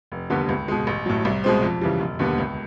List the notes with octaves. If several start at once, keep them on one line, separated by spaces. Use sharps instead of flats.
F1
D#2 D3 G3 B3
C#2
B2 G#3
A1
A2 F#3
C2
B2 G#3 C4
F2
C#3 E3 G3
E1
D#2 D3 G3 B3
C#2